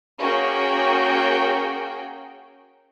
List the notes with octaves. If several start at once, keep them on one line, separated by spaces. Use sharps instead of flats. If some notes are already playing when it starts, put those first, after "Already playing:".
A#3 C#4 F#4 G#4 A#4 G5